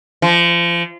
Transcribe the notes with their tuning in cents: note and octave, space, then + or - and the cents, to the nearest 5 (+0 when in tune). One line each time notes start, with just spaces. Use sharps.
F3 -30